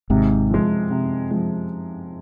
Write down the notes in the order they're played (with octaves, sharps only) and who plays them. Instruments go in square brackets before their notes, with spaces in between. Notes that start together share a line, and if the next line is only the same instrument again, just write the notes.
[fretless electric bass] G#1 G#2 [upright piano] C3
[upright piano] F3 G#3
C3
F3 G#3